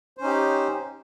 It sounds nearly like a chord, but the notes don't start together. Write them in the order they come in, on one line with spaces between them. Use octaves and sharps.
C5 C#4 D#4 G4